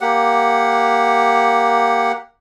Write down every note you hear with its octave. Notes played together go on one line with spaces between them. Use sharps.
A#3 G4 F#5